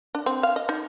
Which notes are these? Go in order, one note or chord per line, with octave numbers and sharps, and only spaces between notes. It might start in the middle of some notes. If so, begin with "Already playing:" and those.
D4
C4
F5
D#5
D#4